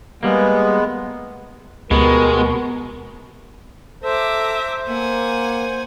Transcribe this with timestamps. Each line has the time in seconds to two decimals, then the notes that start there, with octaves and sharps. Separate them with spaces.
0.23 G3 G#3 A#3 B3
1.91 D2 B2 G#3 G4 A#4
4.03 A4 C5 E5 A#5 D6
4.89 A#3 F#5 G#5